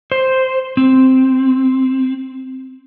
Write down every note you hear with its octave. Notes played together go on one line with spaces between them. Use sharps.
C5
C4